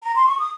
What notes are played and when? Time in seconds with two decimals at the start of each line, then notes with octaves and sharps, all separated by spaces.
0.01 A#5
0.14 C6
0.26 C#6
0.38 D#6